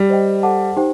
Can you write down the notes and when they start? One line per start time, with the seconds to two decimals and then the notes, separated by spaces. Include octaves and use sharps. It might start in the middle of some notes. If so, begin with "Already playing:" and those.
Already playing: G3
0.10 C5 D#5 G5
0.43 A4 C5 F#5 A5 D6
0.77 D#4 G4 C5 G5